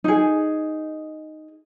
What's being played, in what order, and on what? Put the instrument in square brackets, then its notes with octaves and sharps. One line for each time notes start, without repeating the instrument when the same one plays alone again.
[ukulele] D#4 G#4